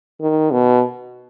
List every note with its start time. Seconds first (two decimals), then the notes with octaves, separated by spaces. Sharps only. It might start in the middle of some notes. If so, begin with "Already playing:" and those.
0.21 D#3
0.51 B2